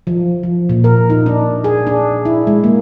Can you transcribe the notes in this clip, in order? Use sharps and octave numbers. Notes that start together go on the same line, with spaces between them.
F3
F3
A#2
A#4
D#4
D4
G#4
D4
E4
G#3
A#3